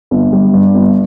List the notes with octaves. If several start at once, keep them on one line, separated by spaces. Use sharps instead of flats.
G1
G3
G2
G1